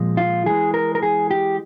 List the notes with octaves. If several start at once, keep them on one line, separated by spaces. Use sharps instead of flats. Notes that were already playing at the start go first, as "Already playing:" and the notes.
Already playing: A#2 F3 G#3
F4
E3 G#3 G#4
A#4
A#4
G#4
G4